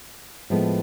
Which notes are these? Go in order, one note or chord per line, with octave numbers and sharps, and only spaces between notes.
A2 F3 G#3 B3